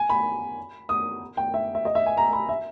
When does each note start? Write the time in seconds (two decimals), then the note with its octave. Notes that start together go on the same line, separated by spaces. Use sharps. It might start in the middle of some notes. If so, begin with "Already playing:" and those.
Already playing: G#5
0.09 B5
0.89 D#6
1.37 G5
1.54 E5
1.75 E5
1.85 D#5
1.95 E5
2.06 G#5
2.17 A#5
2.33 B5
2.49 E5